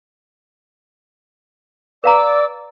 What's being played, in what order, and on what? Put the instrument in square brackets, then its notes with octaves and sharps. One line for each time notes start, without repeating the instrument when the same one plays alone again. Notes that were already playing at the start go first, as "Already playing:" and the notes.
[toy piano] B4 F5 A#5 [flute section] D5 D6 E6